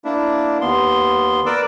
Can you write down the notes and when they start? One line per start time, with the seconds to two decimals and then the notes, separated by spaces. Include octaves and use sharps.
0.05 A#3 D4 E4
0.61 D#2 B3 C6
1.46 A#4 B4 D5 D6 E6